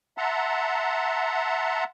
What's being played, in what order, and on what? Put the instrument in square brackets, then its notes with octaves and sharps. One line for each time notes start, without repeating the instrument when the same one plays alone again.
[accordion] E5 F#5 A5 A#5 C6